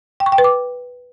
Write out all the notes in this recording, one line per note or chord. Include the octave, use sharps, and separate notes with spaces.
G5
C#6
G5
B4
D6